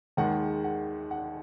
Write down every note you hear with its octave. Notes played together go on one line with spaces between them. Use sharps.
D#2 D#3 G#3 F#5
F#5
F#5